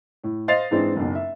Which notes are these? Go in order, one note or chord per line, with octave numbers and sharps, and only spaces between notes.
A2
C5 D#5 F5 A6 C7 F7
G#2 E3 G#3 C4 D4
F#1 B1
E5